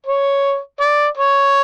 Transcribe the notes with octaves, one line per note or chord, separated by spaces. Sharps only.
C#5
D5
C#5